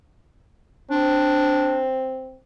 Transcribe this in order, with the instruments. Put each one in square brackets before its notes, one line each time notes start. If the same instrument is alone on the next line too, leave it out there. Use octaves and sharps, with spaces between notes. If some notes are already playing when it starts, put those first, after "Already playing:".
[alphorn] C4 [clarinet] D4